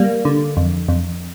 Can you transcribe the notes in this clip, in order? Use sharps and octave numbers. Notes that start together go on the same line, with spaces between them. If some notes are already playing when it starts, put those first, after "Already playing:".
Already playing: G3 A#3
D3
F2
F2